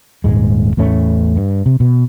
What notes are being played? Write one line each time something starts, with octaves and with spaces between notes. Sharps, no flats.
D#1 G#2 G#3
E2 A2 A3 C#4
G2
C3
B2